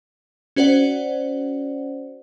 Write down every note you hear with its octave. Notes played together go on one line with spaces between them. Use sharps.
C#4 F#4 C5 D5 F#5